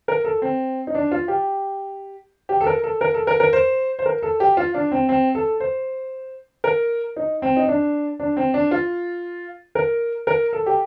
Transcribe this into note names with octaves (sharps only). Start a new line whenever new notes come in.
A#4
A4
C4
D#4
D4
F4
G4
G4
A4
A#4
A4
A#4
A4
A#4
A#4
C5
C5
A#4
A4
G4
F4
D4
C4
C4
A4
C5
A#4
D#4
C4
D#4
D4
D4
C4
D4
F4
A#4
A#4
A4
G4